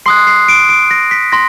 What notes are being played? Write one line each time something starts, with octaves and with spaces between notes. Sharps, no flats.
C6 D#6 F#6 C7
C7
D7
D7
A#6
B6
C6 A#6